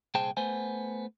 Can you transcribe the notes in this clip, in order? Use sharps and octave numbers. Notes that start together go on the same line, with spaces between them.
C2 A#2 G#4 C5 G5 A5
A3 B3 C5 G#5